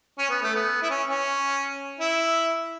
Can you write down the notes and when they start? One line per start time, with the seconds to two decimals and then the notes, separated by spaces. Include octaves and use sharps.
0.18 C#4
0.30 B3
0.42 A3
0.55 B3
0.82 E4
0.90 C#4
1.09 C#4
1.99 E4